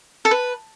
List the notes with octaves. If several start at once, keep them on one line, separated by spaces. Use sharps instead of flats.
A4
B4